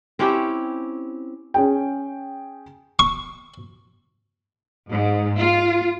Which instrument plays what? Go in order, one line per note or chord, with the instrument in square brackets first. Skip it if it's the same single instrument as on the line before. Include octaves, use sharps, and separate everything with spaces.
[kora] C4 C#4 E4 G4
[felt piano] C#4 G#4 G5
[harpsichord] C#6
[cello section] G#2
F4